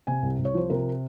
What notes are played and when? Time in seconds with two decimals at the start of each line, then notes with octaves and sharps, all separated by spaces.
0.07 C3 G#5
0.23 C2
0.39 C2
0.45 C#5
0.54 F3 C5
0.70 C3 A#4